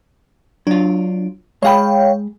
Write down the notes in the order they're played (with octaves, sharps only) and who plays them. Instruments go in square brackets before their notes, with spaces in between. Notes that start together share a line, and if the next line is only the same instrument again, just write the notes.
[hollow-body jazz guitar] F#3 F4 [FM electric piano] D4
[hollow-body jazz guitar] G#3 G#4 B5 [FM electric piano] C#5 F5 G5